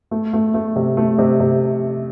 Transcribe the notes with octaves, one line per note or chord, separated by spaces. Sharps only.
A3
A3
A3
C3
A3
C3
C3